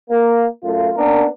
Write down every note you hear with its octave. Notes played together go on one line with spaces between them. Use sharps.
A#3
F#2 A3 F4
A#3 B3 C#4 D4 A#4